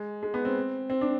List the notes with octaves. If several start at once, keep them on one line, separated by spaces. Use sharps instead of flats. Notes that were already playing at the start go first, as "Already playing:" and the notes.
Already playing: G#3
G#3
B3
C4
C4
D4